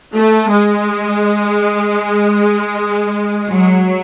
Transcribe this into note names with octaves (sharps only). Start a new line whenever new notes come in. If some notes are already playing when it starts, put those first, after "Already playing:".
A3
G#3
F#3